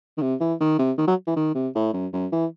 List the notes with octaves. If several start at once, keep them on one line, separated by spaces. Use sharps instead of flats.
D#3
C3
E3
D#3
C3
D#3
F#3
E3
D#3
C3
A2
F#2
F#2
E3